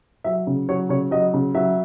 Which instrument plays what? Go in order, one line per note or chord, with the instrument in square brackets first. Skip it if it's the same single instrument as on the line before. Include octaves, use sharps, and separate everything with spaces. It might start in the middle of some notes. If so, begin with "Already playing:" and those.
[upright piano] F#3 E5
C#3
F#3 C#5
C#3 C#5
F#3 D#5
C#3
F#3 E5